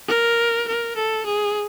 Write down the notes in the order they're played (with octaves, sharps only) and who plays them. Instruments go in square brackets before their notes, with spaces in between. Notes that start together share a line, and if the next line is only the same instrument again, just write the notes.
[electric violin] A#4
A#4
A4
G#4